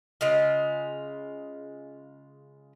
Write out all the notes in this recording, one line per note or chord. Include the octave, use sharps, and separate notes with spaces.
C#3 G#3 F4